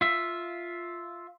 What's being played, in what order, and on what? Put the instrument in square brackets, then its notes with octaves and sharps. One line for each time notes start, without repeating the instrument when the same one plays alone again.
[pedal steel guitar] F4 E5